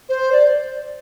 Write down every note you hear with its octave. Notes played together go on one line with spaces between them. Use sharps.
C5
D5